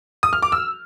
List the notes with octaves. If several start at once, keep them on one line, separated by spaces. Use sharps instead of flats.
D#6
F6
D6
E6